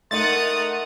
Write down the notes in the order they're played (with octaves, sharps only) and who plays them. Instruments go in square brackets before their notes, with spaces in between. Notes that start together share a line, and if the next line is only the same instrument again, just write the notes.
[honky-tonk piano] A3 D#4 [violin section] A#4 F#5 D#6 [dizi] C6 [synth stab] A6